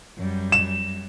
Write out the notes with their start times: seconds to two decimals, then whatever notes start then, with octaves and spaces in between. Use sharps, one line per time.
0.17 F#2 G3
0.52 E7